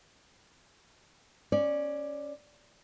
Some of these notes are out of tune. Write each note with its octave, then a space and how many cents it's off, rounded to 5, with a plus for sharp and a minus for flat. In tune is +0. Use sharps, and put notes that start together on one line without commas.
C#4 +0 D5 +10